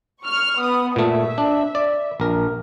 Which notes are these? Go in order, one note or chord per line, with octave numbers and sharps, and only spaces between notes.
C#6 F6
B3 D#6
A#2 A3 E5
D4
D5
A#1 A#4